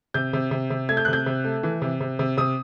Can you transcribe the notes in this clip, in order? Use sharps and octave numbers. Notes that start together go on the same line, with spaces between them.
C3 G6
C3
C3
C3
A3 G#6
G6
C3 F#6
G6
C3
A3
E3
C3
C3
C3
C3 D#6